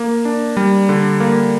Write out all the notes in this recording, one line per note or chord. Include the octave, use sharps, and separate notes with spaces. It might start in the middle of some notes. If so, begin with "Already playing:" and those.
Already playing: A#3
D4
G3
D3
A#3